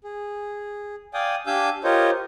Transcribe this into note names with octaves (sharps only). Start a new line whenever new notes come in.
G#4
D5 F5 G5 G#5 D#6
D4 G4 F5 G#5 E6 G6
F4 G4 A#4 C5 C#5 D#5